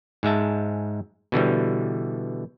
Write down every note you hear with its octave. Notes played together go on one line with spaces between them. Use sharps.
G#2 G#3 E5 A5
B2 D3 E3 G3